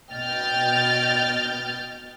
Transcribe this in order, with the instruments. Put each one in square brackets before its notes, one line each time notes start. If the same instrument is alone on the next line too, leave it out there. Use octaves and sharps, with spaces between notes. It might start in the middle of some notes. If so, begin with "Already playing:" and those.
[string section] B2 D#5 G5 F6 G6 A6